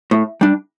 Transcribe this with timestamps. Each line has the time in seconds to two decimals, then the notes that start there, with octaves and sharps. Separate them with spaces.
0.11 A2
0.41 G3 D4